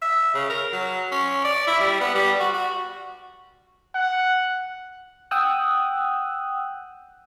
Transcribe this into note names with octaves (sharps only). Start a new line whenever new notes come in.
E5
C#3
A#4
F#3
C#4
D5
E4
G3
B3
G3
F#4
F#4
F#5
F#5 G5 D#6 E6 F#6